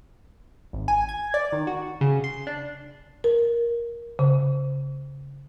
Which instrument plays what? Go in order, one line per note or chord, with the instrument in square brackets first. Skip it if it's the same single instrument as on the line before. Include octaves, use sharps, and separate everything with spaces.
[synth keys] G#1
G#5
G#6
D5
D#3
F#4
C#3
C6
D4
[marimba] A#4
C#3